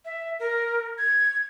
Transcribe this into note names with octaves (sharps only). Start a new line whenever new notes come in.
E5
A#4
G#6